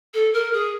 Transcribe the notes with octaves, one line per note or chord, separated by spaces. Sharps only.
A4
A#4
G#4